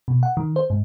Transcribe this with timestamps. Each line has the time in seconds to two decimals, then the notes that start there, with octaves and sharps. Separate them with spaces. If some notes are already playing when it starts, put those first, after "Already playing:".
0.08 B2
0.23 F#5
0.37 D#3
0.56 C5
0.70 G#2